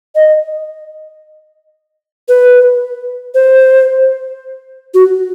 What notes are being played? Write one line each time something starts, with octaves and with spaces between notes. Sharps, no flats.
D#5
B4
C5
F#4